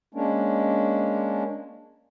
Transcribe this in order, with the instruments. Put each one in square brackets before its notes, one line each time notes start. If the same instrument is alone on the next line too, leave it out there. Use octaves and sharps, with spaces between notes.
[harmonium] G#3 A#3 C#4 D4